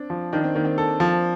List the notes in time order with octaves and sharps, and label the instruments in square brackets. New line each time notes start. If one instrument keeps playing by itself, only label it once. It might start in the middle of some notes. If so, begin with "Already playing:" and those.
Already playing: [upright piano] C4 D4
[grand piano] F3
[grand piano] D#3 [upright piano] D4
[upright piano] C4
[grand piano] D#3 [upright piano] A#3
[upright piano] C4
[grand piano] A4
F3